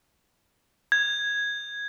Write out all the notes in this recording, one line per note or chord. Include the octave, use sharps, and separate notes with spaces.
G#6